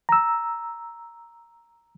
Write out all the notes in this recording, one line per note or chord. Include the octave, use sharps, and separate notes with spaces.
A#5 E6